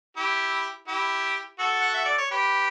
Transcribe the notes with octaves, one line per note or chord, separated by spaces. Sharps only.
E4 G4
E4 G4
F#4 A4
F#5
E5
D5
C#5
G4 B4